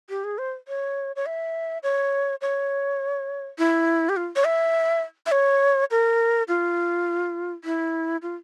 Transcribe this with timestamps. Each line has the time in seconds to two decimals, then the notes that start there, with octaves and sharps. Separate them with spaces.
0.10 G4
0.24 G#4
0.38 C5
0.68 C#5
1.16 C#5
1.26 E5
1.83 C#5
2.41 C#5
3.58 E4
4.09 G4
4.16 F4
4.36 C#5
4.45 E5
5.26 E5
5.32 C#5
5.91 A#4
6.48 F4
7.64 E4
8.22 F4